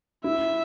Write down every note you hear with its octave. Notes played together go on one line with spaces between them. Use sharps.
E4 E5